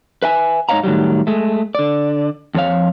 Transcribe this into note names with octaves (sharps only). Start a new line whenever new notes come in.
B4 E5 G#5
G#2 D#4 C#5 E5 F5 A#5
A2 D#3 F#3 G3
G#3 A3
D3 D5
F2 F3 C#5 F5